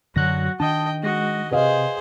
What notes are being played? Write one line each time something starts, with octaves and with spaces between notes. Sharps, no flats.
F#2 D3 F#3 F#4 F#6 A#6
D#3 D4 D#5 G5 A5 D#6
G#3 F#4 D#5 A#6
C3 G#4 B4 C5 D#5 F5